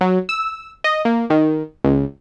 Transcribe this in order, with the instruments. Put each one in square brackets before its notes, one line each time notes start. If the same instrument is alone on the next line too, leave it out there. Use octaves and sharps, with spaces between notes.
[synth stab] F#3
E6
D#5
A#3
D#3
C#2